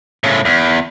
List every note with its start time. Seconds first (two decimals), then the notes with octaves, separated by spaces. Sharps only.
0.24 A2 C#3
0.45 E2